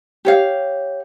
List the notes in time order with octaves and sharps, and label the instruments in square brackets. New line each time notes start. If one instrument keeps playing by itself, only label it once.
[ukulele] G4 C#5 F5